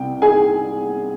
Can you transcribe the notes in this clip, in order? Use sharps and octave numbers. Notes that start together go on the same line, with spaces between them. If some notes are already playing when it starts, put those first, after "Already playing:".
Already playing: C2 C3 G5
G#4 G#5